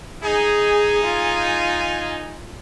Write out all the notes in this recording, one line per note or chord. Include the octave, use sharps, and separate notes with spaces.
D#4 G#4 G#5
F4